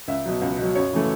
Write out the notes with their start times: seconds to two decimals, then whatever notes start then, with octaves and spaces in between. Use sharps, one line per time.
0.08 C#2 E5
0.25 B2 F#3
0.41 C#2
0.58 B2 F#3
0.75 F#2 C#5
0.93 C#3 E3 A3